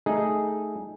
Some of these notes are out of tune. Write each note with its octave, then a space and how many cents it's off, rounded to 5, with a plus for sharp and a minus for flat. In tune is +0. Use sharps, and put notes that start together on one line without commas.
A3 -5 D#4 +0 G#4 +0